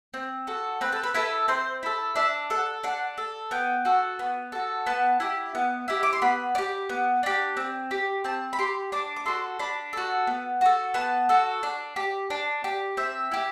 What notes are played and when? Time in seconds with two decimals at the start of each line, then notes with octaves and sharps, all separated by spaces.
0.14 C4
0.47 F#4 A4
0.81 C4 B4
0.92 A4
1.03 B4
1.14 E4 A4 B4
1.48 C4 C5
1.83 E4 A4
2.16 D4 E5
2.50 A4 F#5
2.84 D4 F#5
3.18 A4
3.51 B3 G5
3.85 F#4 A4
4.19 B3
4.52 F#4 A4
4.86 B3 A5
5.20 E4 G4
5.55 B3
5.88 E4 G4
6.03 D6
6.13 C6
6.22 B3 B5
6.55 D4
6.58 G4
6.89 B3
7.23 D4 G4
7.57 C4
7.91 G4
8.24 C4 A5
8.53 B5
8.59 G4 C6
8.92 D4 D6
9.16 D6
9.26 F#4 A4 C6
9.59 D4 B5
9.93 F#4 A4
10.27 B3
10.61 F#4 A4
10.94 B3 A5
11.29 F#4 A4
11.63 D4
11.96 G4
12.30 D4
12.64 G4
12.97 C4 E5
13.32 E4 G4